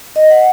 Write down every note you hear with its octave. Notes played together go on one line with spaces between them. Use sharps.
D#5
F#5